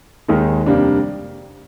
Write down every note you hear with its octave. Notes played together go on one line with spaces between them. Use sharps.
D#2 D#3 G#3 D#4
F2 C3 G3 A#3 D4